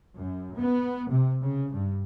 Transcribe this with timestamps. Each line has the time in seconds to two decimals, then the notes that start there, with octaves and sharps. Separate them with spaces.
0.15 F#2
0.56 B3
1.10 C3
1.43 C#3
1.72 G2